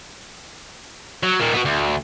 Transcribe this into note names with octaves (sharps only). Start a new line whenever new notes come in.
F#3
A#2 D#3
B3 F#4
D2